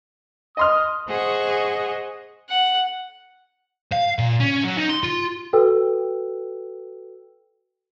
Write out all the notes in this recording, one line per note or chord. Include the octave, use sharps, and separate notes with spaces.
D#5 C6 D#6 F6
G#4 C5 D#5 F#5 C#6
F#5
F5
A#2
C#4
F#3
D#4
C6
F4
F#4 A4 B4 G5 E6